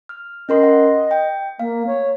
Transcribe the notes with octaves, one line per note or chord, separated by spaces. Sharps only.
F6
C#4 A#4 D#5 C6
F#5
G5
A#3 F5
C#5